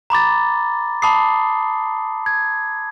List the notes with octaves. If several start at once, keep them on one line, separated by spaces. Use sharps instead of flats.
A#5 B5 D6 A6
A5 B5 D6 D#6 C7
G#6